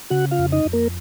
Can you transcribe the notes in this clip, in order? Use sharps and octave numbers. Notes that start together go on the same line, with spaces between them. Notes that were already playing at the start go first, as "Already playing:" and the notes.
C#3 F#4 F#5
F4 F5
F2
D#4 D#5
F2
A#3 A#4